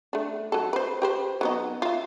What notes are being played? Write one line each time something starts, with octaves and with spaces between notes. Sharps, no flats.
A3 D4
F#3 A4
B4 C5
G4 B4 C5
F#3 B3 D#4
F4 E5